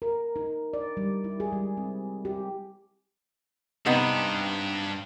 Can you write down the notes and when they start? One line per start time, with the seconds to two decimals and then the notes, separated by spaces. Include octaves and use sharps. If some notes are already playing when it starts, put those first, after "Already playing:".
0.02 A#4
0.36 D#4
0.73 D5
0.97 G3
1.24 E4
1.40 G#4
1.53 G3
1.77 C4
2.25 G4
3.86 G2 C3 B3 D4 D#4